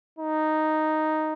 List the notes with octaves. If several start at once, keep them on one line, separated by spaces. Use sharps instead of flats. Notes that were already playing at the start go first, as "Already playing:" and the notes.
D#4